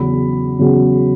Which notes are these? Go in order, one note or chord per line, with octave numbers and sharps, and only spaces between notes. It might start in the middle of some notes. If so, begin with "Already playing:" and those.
Already playing: E2 C#3 F#3 C#4 B5
E2 C#3 F#3 C#4